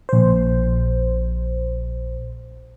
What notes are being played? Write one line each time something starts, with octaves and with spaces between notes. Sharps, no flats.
A#1 C5